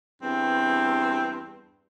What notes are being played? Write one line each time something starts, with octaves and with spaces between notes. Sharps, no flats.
E2 G2 C4